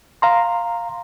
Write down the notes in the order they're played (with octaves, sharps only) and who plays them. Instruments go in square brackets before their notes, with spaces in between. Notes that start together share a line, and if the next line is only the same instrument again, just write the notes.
[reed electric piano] F5 A#5 C6